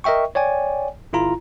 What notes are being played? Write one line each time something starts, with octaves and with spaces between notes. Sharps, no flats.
A#4 D#5 E5 G5 C#6
C#5 D5 G5 G#5
G1 E4 F4 A#5